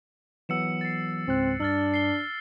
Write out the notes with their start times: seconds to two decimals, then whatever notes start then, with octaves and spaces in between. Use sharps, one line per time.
0.49 E3 F#3 B3 E6 C#7 E7
0.81 A6 C7
1.28 C#2 G#2 C4 F#6
1.60 G2 D4 E6 F6 A6
1.94 C7 G7